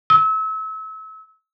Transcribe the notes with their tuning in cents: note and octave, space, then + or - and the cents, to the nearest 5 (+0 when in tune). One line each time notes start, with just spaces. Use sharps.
E6 -35